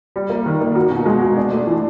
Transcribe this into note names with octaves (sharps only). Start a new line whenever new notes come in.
G3
A#3
D#3
A#3
F#4
B2
G#3
F#4
D4
A3
E3